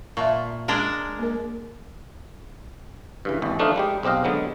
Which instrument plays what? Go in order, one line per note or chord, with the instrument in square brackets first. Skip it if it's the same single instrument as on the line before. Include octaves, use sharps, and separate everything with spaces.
[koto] A#2 [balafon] E5 A5 C#6
[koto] G#3 D4 A#4
[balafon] A#3 A#4
[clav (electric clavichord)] G2 C#3 E3
G#1 D#2 E3
F3 A3 D4 D#4 F4 F5
G3 G#3 G4
B1 C4 G4 D#5 F5
D3 F#3 G#3 B3